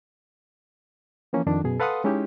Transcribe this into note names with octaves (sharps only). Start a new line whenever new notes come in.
E3 F3 A#3 C#4
F2 D#3 D4
F#2 B2 G#4
A4 B4 F5 F#5 C6 D#6
G#3 C#4 D#4 E4 G4